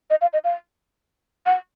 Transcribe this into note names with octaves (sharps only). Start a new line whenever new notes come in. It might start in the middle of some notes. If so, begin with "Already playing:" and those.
D#5
F5
D#5
F5
F#5